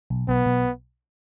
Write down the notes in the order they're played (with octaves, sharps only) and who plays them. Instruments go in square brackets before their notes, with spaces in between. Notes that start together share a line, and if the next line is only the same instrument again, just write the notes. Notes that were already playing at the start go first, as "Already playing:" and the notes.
[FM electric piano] B1
[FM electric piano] B1 [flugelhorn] B3
[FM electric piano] B1